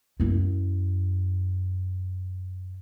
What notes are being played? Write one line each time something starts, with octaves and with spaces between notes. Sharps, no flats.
F#2 E4